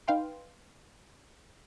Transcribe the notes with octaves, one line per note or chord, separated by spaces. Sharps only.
D#4 B4 F5 G5 C6